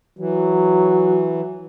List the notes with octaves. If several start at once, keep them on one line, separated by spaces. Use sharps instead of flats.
E3 F#3